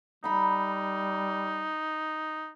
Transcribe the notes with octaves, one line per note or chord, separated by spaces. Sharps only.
G3 D#4 A#5 B5